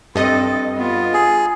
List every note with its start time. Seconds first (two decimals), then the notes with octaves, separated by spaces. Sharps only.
0.15 G2 C4 A4 D#5
0.77 B3 F4
1.14 G#4